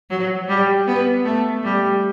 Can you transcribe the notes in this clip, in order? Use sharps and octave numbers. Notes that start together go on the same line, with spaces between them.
F#3
G3
B3
A3
G3